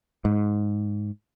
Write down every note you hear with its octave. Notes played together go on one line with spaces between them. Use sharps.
G#2